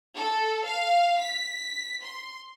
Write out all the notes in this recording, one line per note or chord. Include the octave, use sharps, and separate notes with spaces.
A4
F5
B6
C6